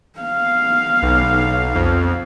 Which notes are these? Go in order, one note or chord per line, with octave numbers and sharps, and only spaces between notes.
B3 F5
B1
F2